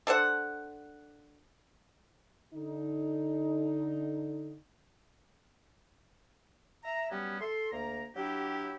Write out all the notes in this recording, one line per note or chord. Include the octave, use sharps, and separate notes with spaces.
D4 A4 C5 F#5
D3 D#4
E5 A#5
F#3 G3 B3 C#4 G4
A4 C6
D2 A#3 A#5
F#3 D4 E4 G4